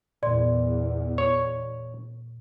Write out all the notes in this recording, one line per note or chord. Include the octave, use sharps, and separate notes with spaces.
E2 A#2 D5 C6
C#5